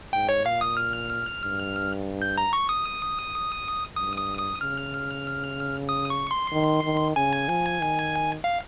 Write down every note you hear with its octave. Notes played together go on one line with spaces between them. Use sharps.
G#2 G5
C#5
A#2 F5
D#6
F6
G2
G6
A#5
C#6
D#6
G2 D#6
D#6
D#6
C#3 F6
D#6
C#6
C6
D#3
D#3
C#3 G#5
F3
D#3
F5